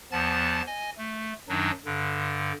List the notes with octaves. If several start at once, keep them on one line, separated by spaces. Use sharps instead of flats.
E2 F3 B3 A5 A6
D#5 G#5
A3
F#2 D#3 F#3 D4 D#4
G2 D3